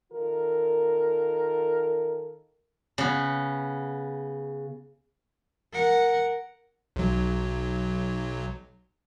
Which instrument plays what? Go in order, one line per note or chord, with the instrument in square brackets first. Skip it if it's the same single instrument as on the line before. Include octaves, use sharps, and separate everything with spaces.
[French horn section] D#3 F4 A4 A#4
[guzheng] C#3 B3
[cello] A#4 F#5
[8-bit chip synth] B1 F#3